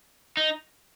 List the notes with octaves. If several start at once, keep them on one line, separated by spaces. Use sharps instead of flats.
D#4